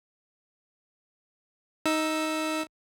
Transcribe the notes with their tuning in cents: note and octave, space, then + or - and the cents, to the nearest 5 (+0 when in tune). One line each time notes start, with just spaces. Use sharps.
D#4 +10 E6 +0